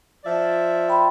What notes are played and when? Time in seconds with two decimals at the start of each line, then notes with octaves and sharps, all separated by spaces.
0.25 F3 D5 E5
0.89 G5 B5 C6